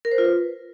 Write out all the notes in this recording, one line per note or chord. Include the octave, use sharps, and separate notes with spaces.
A#4
C5
F4
B4